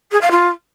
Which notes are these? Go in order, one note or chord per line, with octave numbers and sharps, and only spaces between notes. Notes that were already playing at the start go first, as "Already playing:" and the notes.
G#4
F5
F4